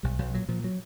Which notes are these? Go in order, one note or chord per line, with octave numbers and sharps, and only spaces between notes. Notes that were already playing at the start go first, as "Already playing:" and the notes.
B1 G3
B1 F#3
A#2 F#3
A#2 F3
F#3